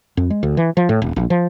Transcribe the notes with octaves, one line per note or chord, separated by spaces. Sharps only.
F2
G#3
D2
E3
F3
A2
D#1
A#1
F3